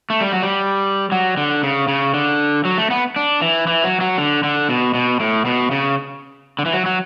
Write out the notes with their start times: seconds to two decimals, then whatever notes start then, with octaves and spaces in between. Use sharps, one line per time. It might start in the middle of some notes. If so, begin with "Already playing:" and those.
0.10 A3
0.21 G3
0.32 F#3
0.43 G3
1.12 F#3
1.37 D3
1.63 C#3
1.88 C#3
2.14 D3
2.65 F#3
2.78 A3
2.91 B3
3.16 D4
3.42 E3
3.67 E3
3.84 F#3
4.01 F#3
4.18 D3
4.44 D3
4.69 B2
4.94 B2
5.20 A2
5.45 B2
5.71 C#3
6.59 D3
6.66 E3
6.73 F#3
6.86 F#3